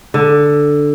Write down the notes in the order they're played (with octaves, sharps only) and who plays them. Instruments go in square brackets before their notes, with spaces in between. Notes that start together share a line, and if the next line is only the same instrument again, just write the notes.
[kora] D3